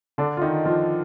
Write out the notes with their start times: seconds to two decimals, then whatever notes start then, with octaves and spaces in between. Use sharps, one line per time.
0.18 D3 D4
0.37 F4
0.42 D#3 D#4
0.65 F3 F4